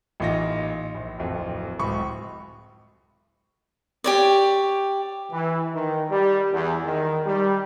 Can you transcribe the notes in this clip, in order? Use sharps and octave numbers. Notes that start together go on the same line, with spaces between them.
A1 A#2 D#4 F4 A#6
A#1
D1 F2
D1 C#2 B5 C#6
G4 C#5 D5
E3
D#3
G3
E2
D#3
G3